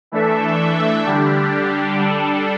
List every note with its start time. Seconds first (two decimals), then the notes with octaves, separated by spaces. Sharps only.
0.12 E3 A3 D4 A4 E5
1.06 D3 G3 D4 G4
1.99 G3 D4 A4